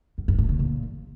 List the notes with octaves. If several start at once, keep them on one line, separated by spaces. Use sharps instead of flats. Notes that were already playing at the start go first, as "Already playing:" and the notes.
F#2
G2
A2
C#3
A#2